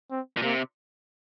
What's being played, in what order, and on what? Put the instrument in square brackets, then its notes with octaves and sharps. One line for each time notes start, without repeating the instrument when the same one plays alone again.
[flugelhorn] C4
[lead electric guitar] A#2
[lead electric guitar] C3 [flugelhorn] A#3